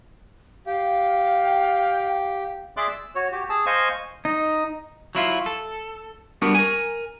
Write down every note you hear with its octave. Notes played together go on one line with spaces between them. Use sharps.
G4 F5
G5
G#4 D5 E5 C6 D6 F#6
E6
F#4 C#5
F#4 G4
G#4 A5 E6
C5 D#5 F5 G#5 C#6
D#4
F#3 E4 F4
A4
G3 B3 D4 F#4 A#4
A#4 G#5